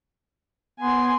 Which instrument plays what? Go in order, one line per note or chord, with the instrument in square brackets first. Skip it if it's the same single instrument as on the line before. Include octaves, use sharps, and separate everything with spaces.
[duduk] B3 [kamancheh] G#5 C6